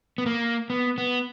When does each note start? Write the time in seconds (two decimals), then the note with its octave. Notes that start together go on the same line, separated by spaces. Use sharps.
0.18 B3
0.26 A#3
0.70 B3
0.98 B3